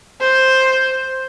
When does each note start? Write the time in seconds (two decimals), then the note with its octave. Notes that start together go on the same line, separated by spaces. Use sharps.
0.21 C5